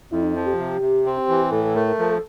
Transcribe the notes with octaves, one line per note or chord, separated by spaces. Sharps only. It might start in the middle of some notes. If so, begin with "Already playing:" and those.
F2 E4
D#4
F3 E4
G4
C3
C3
C4
E3
A2 A4
A4
A3 A#4
A#4
F3 A#4
A4